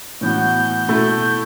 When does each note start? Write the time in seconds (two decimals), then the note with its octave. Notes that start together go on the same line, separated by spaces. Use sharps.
0.21 A2 E3 B3 F#4 G6
0.55 G6
0.87 B2 A3 E4 G6
1.21 G6